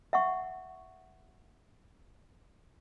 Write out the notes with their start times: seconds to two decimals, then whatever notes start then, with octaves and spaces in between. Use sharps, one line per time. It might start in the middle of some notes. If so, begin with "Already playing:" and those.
0.13 E5 F#5 C#6